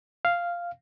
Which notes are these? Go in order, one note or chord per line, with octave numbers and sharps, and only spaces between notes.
F5